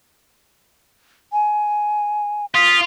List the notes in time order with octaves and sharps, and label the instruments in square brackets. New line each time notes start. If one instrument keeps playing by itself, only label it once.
[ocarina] G#5
[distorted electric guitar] F4 [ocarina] D#6 [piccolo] B6